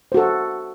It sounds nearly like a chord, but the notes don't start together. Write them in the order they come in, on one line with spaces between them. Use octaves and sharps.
C5 F#4 A4